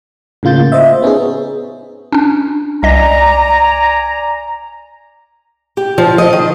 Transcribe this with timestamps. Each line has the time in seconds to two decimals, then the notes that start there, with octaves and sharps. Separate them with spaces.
0.43 A2 C#3 A#3 F4 G6 A6
0.72 C5 D#5 E5
1.02 B3 C#4 D#4 G#4
2.12 C#4 D4
2.83 C2 D5 D#5 G#5 A#5 A#6
5.77 G4
5.98 F3
6.18 D#5
6.33 D#3